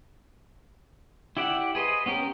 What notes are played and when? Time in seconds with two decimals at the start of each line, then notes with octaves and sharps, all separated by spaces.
1.37 E4 G4 D5 E5 F#5
1.75 G#4 B4 C5 D#5
2.06 B3 C#4 G4 A#4